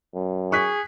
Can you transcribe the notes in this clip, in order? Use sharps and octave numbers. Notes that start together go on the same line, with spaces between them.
F#2
G#4 C#6 F#6 B6